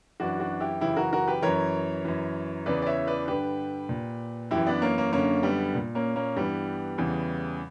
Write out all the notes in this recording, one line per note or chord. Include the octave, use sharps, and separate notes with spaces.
F#2 E3 D4 F#4
D4 F#4
E4 G4
F#2 C#3 E3 E4 G4
F#4 A#4
F#4 A#4
G4 B4
F#2 E3 A#4 C#5
F#2 E3
E2 C#3 E3 B4 D5
D5
C#5 E5
B4 D5
G2 D3 G4 B4
A#2
F#2 E3 E4 G4
B3 D4
A#3 C#4
A#3 C#4
F#2 D3 A#3 C#4
G3 B3
A#2
A#3 C#4
A#3 C#4
G2 E3 G3 B3
E2 C#3 E3